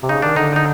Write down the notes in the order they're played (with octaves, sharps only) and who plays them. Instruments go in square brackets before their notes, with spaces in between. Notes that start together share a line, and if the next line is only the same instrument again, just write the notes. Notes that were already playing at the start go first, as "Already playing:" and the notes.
[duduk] C3
[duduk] C#3 [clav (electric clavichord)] D#4
[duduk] D#3 [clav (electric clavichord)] D4
[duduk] D3 [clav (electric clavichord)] D#4
[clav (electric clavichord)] D#4